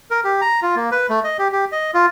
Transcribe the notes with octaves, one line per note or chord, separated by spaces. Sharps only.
A#4
G4
A#5
F4
A#3
B4
A3
D#5
G4
G4
D#5
F4